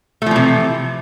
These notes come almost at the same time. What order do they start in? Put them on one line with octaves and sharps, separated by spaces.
A3 F3 E3 C3